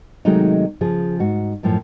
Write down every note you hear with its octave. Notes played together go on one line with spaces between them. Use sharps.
C3 D#3 F#3 G#3 A3 D#4
C#3 F3 G#4
G#2 F#4
F#2 A2 F3